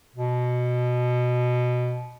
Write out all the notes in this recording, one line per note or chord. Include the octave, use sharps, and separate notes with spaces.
B2